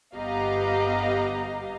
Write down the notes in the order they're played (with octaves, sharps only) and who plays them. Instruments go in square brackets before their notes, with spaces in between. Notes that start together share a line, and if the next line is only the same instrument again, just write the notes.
[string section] G1 B3 G4 D#5 F5 A#5